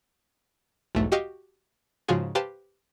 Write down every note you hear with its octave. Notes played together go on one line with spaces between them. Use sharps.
B1 E2 G#2 A3
F#4 G4 D#5 F5 C#6
G#2 C#3 F3 F4 F#4 G#4
G4 B4 C5 F5 G5 A5